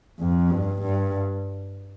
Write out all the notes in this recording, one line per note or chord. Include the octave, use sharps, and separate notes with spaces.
F2
G2
G2